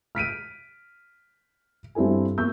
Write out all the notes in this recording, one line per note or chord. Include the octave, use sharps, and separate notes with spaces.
F6 B6 D7 D#7
G2 C4 E4 A4 G#5
A#3 C#6 E6 G6